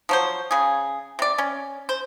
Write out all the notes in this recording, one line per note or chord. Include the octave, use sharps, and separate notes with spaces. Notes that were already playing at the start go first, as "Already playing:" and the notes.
F3 F#3 C5
C#3 G#4
C3 D5
C#4
C5